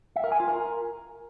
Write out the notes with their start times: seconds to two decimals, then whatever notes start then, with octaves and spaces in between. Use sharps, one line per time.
0.16 E5
0.24 A#4
0.32 G#5
0.40 F4
0.48 A#4